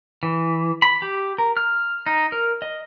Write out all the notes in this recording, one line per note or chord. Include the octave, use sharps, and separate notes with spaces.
E3
B5
G4
A#4
F6
D#4
A#4
D#5